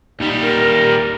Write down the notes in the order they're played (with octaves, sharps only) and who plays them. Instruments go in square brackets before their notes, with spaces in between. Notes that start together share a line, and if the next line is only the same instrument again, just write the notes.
[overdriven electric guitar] D#2 G3 [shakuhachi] D#4
[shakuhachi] A#4